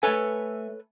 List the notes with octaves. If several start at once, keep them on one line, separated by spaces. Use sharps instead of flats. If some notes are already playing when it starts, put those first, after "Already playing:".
A3 A4 B4 C#5 E5 G#5